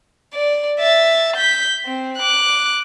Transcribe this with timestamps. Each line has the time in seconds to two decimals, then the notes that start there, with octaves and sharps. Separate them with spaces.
0.34 D5
0.80 E5 A6
1.36 G6 B6
1.85 C4
2.18 D6 F#6